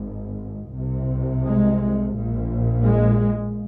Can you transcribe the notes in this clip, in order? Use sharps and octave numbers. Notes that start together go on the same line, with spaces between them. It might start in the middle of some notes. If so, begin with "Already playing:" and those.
Already playing: G#1 G#2
C2 C3
G#3
A#1 A#2
G#3